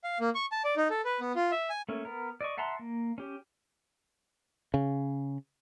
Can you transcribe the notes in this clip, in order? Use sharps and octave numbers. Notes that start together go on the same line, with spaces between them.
F5
A#3
C#6
A5
D5
D#4
A4
B4
B3
F4
E5
G#5
A3 A#3 C#4
B3 A#4
D5 D#5 C#6
E5 F#5 A5 A#5 C6
A#3
C#4 G4
C#3